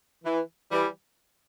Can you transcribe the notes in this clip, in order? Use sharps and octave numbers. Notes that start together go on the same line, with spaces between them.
E3
E3 G3